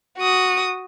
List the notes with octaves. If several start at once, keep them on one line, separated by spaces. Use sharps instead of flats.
F#4 D#6